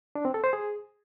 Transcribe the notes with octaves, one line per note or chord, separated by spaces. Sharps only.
D4
C4
A4
C5
G#4